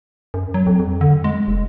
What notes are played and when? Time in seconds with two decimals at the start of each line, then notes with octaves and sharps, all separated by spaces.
0.34 F#2
0.54 F#3
0.67 F2
0.79 F2
1.01 D3
1.24 G#3
1.48 F1